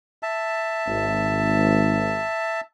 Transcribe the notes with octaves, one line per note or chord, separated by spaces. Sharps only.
E5 A5
G#1